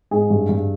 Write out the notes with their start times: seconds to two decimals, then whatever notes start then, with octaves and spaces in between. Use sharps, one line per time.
0.11 G#2 G#4
0.30 G2
0.49 G2